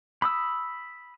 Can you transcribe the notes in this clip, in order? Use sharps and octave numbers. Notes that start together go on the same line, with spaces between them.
B5 D#6 E6